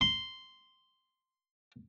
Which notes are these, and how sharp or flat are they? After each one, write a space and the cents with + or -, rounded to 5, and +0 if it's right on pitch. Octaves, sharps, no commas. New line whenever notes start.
C6 -5